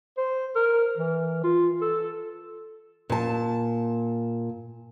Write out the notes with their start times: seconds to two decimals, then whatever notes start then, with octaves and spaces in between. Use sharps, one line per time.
0.18 C5
0.55 A#4
0.98 E3
1.44 F4
1.82 A4
3.10 A#2 A5